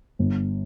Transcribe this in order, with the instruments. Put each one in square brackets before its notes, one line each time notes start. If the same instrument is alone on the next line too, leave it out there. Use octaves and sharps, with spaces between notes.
[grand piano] G1